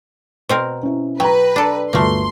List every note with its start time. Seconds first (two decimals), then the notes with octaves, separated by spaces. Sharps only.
0.49 B2 C4 A#4 C5
0.83 C#4 E4
1.20 F#3 B4 G5 A#5
1.56 D4 A4
1.93 G1 D2 A3 A#3 B4 C6